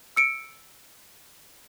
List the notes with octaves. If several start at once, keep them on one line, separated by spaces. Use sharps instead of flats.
E6 C#7 D7